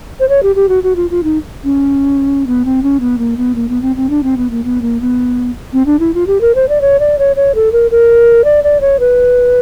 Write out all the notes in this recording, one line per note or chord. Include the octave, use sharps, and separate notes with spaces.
C5
C#5
G4
G4
F#4
F#4
F4
F4
D#4
C#4
B3
C4
C#4
B3
A#3
B3
A#3
B3
C4
C4
D4
C4
B3
A#3
B3
A#3
B3
C4
D4
E4
F4
G4
A#4
C5
D5
C#5
D5
C#5
C#5
A4
A#4
A#4
D5
D5
C#5
B4